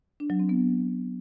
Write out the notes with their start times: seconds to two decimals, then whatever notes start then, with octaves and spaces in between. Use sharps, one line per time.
0.20 D4
0.30 F#3
0.40 C4
0.49 B3